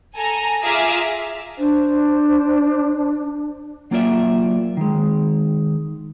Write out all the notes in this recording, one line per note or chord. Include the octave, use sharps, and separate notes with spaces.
A4 G#5 A#5
F4 G#4 E5 F5 A#5 D6
D4 C5
F#3 A#3 F4 D5 E5
D#3 G#3